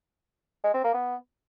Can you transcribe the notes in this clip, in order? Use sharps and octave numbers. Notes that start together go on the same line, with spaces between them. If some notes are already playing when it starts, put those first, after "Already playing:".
G#3
C4
A#3
B3